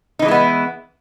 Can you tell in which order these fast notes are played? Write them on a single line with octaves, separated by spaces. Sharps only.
D#4 E3 G#3 E4 B3